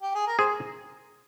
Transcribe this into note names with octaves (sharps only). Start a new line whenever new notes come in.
G4
G#4
A#4
G#4 C5